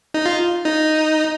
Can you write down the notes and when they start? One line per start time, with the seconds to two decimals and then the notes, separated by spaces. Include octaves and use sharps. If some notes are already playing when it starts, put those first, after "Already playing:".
0.14 D#4
0.26 F4
0.65 D#4